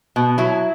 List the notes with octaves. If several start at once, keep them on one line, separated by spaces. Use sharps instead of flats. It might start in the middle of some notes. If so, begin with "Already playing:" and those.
B2
F#3 E4